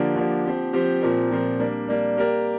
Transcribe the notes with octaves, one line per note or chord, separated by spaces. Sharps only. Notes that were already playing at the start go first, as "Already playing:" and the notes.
Already playing: D3 F3 A#3 D4 G4
D3 F3 A#3 D4 G4
F3 C4 G4
F3 C4 G4
A#2 F3 C4 A#4
A#2 F3 C4 A#4
G3 A#3 D4
G3 A#3 D4
A#3 G4 A#4 D5